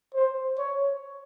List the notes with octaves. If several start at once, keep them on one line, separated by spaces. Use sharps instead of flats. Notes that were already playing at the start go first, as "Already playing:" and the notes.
C5
C#5